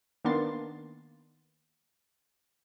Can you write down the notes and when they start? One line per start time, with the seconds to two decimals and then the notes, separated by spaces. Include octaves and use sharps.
0.24 D#3 A#3 B3 D4 C6 A6